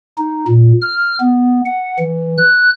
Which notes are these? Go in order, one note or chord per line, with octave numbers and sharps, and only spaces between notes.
D#4
A#2
F6
B3
F#5
E3
F#6